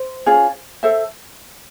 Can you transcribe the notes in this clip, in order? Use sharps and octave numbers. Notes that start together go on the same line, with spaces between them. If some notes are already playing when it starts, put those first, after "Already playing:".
Already playing: C5
C#4 F4 G#4
A4 C5 E5